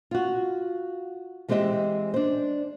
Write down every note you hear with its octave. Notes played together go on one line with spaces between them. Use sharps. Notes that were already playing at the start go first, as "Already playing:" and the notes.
F4 F#4
E3 G#3 C4 G4 D#5 E5
D4 C5